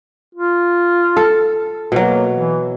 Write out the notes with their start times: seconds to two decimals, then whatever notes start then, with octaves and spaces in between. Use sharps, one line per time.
0.35 F4
1.17 A4
1.92 B2 F#3 A#3
2.33 E3